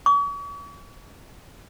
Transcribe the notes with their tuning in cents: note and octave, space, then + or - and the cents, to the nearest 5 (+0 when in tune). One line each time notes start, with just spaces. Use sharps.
C#6 +45